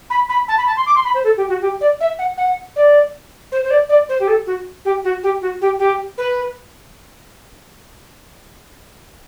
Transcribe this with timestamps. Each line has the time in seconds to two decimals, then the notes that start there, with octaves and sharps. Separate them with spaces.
0.10 B5
0.29 B5
0.48 A5
0.57 B5
0.66 A5
0.76 C6
0.86 D6
0.95 C6
1.05 B5
1.14 C5
1.24 A4
1.37 G4
1.49 F#4
1.61 G4
1.81 D5
2.00 E5
2.19 F#5
2.37 F#5
2.76 D5
3.52 C5
3.64 C5
3.70 D5
3.89 D5
4.09 C5
4.20 G4
4.28 A4
4.46 F#4
4.85 G4
5.04 F#4
5.23 G4
5.41 F#4
5.61 G4
5.79 G4
6.18 B4